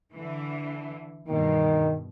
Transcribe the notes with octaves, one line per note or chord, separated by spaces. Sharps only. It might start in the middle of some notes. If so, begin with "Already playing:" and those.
D3 E3
E2 G2 B2 D#3